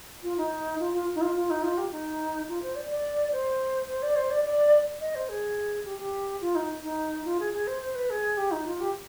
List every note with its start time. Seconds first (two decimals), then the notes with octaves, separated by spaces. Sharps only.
0.23 F4
0.37 D#4
0.79 F4
0.93 F4
1.15 D#4
1.21 F4
1.36 F4
1.50 D#4
1.63 F4
1.78 G4
1.92 D#4
2.48 F4
2.62 C5
2.75 D5
2.90 D5
3.32 C5
3.88 C5
4.02 D5
4.16 C5
4.30 D5
4.44 D5
5.00 D#5
5.15 C5
5.29 G#4
5.85 G4
5.98 G4
6.41 F4
6.55 D#4
6.83 D#4
7.25 F4
7.40 G#4
7.53 G#4
7.67 C5
7.82 C5
7.95 B4
8.10 G#4
8.37 G4
8.51 D#4
8.66 F4
8.80 G4